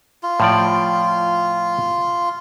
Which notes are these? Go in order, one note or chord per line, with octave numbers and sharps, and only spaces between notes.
F4
A2 F3 D5